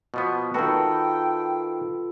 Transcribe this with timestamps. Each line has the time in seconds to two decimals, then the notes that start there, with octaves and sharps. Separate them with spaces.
0.14 B2 F3 B3
0.54 D#3 F4 F#4 A4 B4 G5